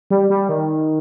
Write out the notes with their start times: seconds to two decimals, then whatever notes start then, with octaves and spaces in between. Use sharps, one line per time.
0.10 G3
0.30 G3
0.49 D#3